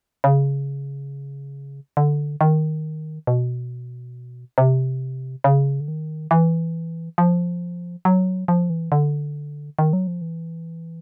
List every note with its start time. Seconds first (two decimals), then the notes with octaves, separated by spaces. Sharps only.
0.24 C#3
1.97 D3
2.41 D#3
3.27 B2
4.58 C3
5.44 C#3
5.80 D3
5.88 D#3
6.31 E3
7.18 F3
8.05 F#3
8.48 F3
8.70 E3
8.92 D3
9.79 D#3
9.93 F#3
10.07 F3
10.22 E3